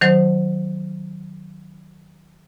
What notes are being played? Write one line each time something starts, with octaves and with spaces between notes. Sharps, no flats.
D#3 F#3 C5